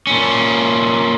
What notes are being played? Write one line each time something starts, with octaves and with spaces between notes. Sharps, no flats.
A#2 C#4